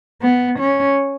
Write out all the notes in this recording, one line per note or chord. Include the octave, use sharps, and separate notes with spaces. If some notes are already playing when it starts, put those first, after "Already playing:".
B3
C#4